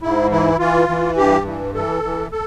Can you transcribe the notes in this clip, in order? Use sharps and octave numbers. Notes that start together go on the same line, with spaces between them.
G#2 E4
E3 E4
E3 F4
E3
G2 G4
E3
E3 A4
E3
A4